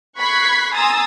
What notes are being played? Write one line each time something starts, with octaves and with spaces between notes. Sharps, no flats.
B5 C#6 F#6 G#6 B6 C7
G#5 A#5 C6 D#6 E6 A6